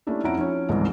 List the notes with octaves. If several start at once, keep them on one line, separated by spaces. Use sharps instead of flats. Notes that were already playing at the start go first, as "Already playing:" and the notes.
A3 A#3 C#4 D4 E4 G4
F2 C#4 E4 F#5 A#5 D7
F3 C#4 E4 C#5
G1 C#2 G#2 C3 E3 F3